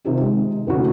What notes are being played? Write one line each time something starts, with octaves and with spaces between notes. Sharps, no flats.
C3 D#3 F4 G4
G#3
F1 A2 D3 F#4